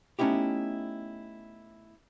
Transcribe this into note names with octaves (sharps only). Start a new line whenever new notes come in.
A3 B3 C#4 D#4 E4 G4